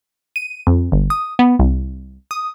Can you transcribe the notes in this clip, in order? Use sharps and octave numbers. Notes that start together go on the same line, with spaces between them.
D#7
F2
G1
D#6
B3
C2
D#6